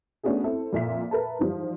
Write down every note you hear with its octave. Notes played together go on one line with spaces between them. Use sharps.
A3 B3 C#4 D4 F#4 G#4
C4 E4 A4
F2 A#2 E5 B6
A#4 B4 E5 A5
G#2 E3 F3 G3